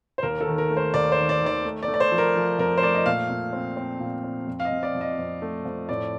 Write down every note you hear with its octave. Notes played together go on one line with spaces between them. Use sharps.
C5
D#2 A#4
A4
D#3
A#4
A3
C5
D#2 D5
C5
D#3
D5
D#3 D5
A3
D5
A3
D5
C5
F3
A#4
F3
F2 A#4
C5
A3 D5
D#5
A#2 F5
A#2
C4
C4
A#2
C4
F2
F5
D#5
F2
D5
F2
D#5
F2
A3
F2
A2 D5